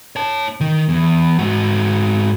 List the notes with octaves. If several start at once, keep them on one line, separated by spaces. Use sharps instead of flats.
C#5 A5
D#3
E2
G#2 F#4